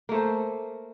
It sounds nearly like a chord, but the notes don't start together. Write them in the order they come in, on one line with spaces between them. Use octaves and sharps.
A#3 A3 C5